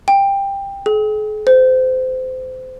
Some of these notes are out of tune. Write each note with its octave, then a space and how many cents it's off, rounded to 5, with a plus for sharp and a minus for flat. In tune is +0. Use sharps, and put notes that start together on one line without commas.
G5 +15
G#4 +40
C5 -25